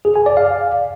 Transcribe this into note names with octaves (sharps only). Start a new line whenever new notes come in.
G#4
G#5
D5
F5